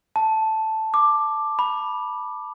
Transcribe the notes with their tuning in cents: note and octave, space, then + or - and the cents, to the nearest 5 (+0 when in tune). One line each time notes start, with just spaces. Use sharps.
A5 +0
D6 +10
B5 -10